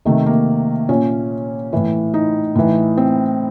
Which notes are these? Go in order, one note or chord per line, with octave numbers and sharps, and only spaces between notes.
C3 D#3 A3
A#3
A#2 C#4
A2 E3
D#4
A2 E3
C4